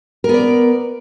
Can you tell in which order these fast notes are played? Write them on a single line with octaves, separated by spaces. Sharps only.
A#4 B3 D5